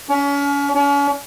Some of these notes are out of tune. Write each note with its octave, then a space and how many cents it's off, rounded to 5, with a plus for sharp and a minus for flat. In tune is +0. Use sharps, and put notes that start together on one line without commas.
C#4 +35
C#4 +40